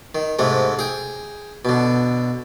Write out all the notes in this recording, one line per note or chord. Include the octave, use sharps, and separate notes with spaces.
D#3
G#2 C3 G#3 A3
G#4 G5
B2 D3